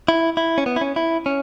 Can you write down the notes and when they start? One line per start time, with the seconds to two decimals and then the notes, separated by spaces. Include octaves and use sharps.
0.08 E4
0.37 E4
0.58 C#4
0.66 B3
0.76 E4
0.81 C#4
0.96 E4
1.26 C#4